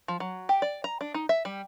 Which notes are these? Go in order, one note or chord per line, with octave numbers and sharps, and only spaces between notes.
F3
F#3
G4
D5
A#5
D4
D#4
E5
G3